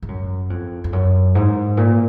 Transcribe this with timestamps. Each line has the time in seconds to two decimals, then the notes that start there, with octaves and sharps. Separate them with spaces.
0.02 G#2
0.08 F#2
0.50 F2
0.84 F2
0.93 F#2
1.35 G#2
1.77 A#2